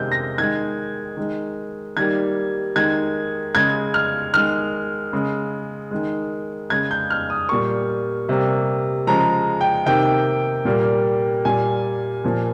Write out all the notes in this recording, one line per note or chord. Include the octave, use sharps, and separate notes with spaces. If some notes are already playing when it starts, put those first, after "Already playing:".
Already playing: C3 D#3 G#3 G6
A#6
D#3 G#3 G#6
D#3 G#3
D#3 G3 A#3 G#6
D#3 G#3 G#6
C#3 G#3 G#6
F6
D#3 G#3 F6
C#3 G#3
D#3 G#3
C#3 G#3 G#6
G6
F6
D#6
A#2 G3 A#3 C#6
C3 G3 A#3
C#3 F3 G#3 A#5
G5
C3 D#3 A#3 G5
A#2 G3 A#3
A#2 G3 A#3 G#5
A#2 F3 A#3